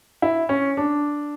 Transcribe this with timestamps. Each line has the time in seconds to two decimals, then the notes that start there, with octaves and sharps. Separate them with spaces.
0.22 E4
0.49 C#4
0.77 D4